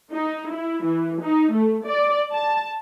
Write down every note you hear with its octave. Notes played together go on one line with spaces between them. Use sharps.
D#4
E4
E3
D#4
A3
D5
A5